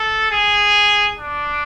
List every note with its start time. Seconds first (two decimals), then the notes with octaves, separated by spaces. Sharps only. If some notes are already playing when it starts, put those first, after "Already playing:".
Already playing: A4
0.31 G#4
1.19 D4